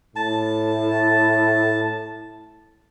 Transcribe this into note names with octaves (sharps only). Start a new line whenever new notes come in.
A2 A5